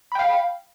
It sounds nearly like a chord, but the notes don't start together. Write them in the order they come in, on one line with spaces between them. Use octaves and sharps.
B5 G5 F5